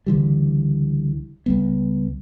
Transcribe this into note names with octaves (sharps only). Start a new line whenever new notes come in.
C#2 D3 E3 G3
C#2 G3 B3